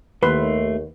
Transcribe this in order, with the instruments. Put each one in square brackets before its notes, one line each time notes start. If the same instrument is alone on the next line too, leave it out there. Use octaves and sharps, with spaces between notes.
[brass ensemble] D#2 [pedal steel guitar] A3 C6 [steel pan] B4